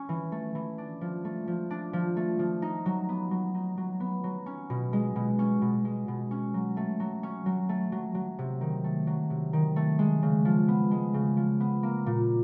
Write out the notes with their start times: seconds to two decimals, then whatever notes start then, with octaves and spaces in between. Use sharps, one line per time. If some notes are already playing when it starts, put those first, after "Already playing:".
Already playing: C#4
0.09 E3
0.32 A3
0.55 E3
0.78 D4
1.01 F3
1.25 A3
1.47 F3
1.70 D4
1.93 F3
2.17 A3
2.39 F3
2.62 D#4
2.86 F#3
3.09 B3
3.31 F#3
3.55 D#4
3.78 F#3
4.00 B3
4.24 F#3
4.46 C#4
4.70 B2
4.93 G#3
5.16 B2
5.39 C#4
5.62 B2
5.85 G#3
6.08 B2
6.31 C#4
6.54 F#3
6.77 A3
7.00 F#3
7.23 C#4
7.46 F#3
7.69 A3
7.92 F#3
8.15 F#3
8.39 C3
8.61 D#3
8.84 A3
9.07 F#3
9.30 C3
9.53 D#3
9.76 A3
9.99 G#3
10.22 C#3
10.45 F3
10.68 B3
10.91 G#3
11.14 C#3
11.37 F3
11.60 B3
11.83 A#3
12.06 A#2